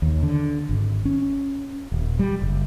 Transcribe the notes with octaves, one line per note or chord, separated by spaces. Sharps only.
D#2
D3
G#1
C#4
D#1
G3
F#1